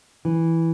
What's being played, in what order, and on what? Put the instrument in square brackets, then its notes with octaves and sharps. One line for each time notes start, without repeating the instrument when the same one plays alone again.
[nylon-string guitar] E3